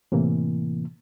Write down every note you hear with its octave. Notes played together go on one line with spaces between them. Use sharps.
A2 C3 E3 A#3